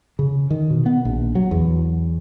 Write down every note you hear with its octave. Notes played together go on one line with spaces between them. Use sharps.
C#3
D#3
B2
B3
A#1
F#3
E2